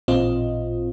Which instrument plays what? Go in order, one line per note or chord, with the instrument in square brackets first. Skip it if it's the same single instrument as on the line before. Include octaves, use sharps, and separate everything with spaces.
[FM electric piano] A1 A#2 C4 F4 D#5